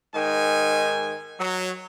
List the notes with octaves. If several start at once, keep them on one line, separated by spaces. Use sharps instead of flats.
G#2 D#3 G#5
F#3